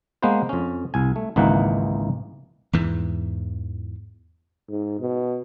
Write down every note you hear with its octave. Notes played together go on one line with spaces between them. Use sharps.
G#3 A#3 B3 B4 C5
F2 C#4
C2 G#5
A3
G#1 C#2 E3 A#3 D#4 F#5
E2 G#2 E3
G#2
B2